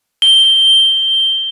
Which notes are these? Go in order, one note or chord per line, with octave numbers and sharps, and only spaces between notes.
G7